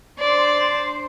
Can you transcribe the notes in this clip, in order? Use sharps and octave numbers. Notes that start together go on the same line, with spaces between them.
D4 C5 D5